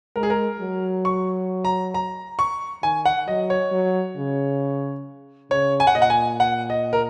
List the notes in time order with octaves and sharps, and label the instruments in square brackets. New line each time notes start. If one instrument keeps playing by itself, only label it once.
[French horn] G#3 [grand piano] A#4
[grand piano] G#4
A#4
[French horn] F#3
[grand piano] C#6
A#5
A#5
C#6
[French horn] D#3 [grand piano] G#5
[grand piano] F#5
[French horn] F#3 [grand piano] D#5
[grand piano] C#5
[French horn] F#3
C#3
[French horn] C#3 [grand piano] C#5
[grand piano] G#5
F#5
[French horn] A#2 [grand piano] D#5
[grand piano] F#5
G#5
F#5
D#5
A#4